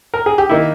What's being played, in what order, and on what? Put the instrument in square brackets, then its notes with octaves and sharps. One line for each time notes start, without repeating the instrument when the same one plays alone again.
[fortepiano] A#4
G#4
G4
[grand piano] D#3 A#3 D#4 [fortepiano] E4